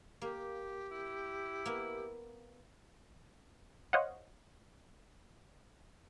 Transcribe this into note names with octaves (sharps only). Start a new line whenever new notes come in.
A#3 G4
E4
A#3 B3
C5 C#5 D#5 F5 F#5